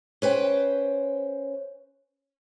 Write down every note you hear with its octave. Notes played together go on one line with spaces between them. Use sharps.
C#4 B4 C5 G5